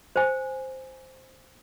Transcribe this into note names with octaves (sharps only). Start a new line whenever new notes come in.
C5 G#5